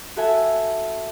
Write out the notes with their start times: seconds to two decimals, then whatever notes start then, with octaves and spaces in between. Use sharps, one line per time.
0.16 F#4 A4 E5 G#5